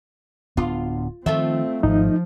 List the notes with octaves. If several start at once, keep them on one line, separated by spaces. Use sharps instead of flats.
D1 B3 D4 F4
D#3 F3 A3 C4 F4 E5
G#1 F3 D#4